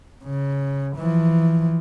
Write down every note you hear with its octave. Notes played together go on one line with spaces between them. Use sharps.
C#3
E3 F3